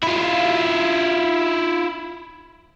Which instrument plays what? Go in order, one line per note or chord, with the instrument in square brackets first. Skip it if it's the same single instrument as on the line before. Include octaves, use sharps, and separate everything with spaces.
[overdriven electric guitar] E4 F4